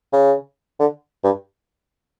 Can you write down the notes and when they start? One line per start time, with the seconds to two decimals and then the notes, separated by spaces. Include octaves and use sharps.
0.13 C#3
0.80 D3
1.24 G2